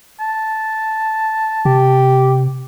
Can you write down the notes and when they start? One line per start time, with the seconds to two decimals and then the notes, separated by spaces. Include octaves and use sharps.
0.20 A5
1.65 C3 G4